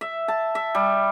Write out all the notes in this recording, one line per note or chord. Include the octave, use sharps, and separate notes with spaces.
E5
A5
E5
G3